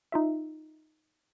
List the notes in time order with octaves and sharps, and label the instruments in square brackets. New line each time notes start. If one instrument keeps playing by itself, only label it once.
[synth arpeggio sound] D#4 F4 E5